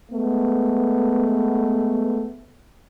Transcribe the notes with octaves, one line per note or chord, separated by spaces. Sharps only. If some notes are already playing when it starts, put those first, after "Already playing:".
G#3 A3 B3